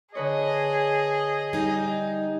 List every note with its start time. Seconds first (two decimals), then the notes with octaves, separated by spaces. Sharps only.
0.15 D3 G#4 B4 C#5 D#5
1.53 G3 D#4 G#5